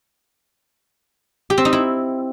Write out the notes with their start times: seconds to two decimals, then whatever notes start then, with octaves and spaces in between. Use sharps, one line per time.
1.50 G4
1.58 C4
1.65 D#4
1.73 E4